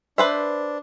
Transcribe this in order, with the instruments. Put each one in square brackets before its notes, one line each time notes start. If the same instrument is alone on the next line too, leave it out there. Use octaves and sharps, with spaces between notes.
[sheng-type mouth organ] D4 [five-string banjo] B4 C5 E5